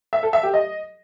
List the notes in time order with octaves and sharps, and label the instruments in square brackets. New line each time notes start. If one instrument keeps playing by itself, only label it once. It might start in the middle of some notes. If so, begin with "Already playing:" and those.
[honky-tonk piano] E5
A4
E5
G4
D#5